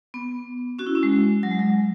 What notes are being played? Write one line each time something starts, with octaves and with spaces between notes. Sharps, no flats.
B3
C#4 F#4
E4
C#4
G#3
F#3
G#3
F#3